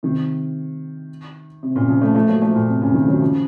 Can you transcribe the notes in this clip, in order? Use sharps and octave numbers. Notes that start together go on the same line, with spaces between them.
C3 D#3
C3
A#2 C#3
C#3 F3
F3 A3
F3 A3
F#3 A#3
F3 A3
A#2
C3
A#2 C#3
C3 D#3
D#3 F#3
C#3 F3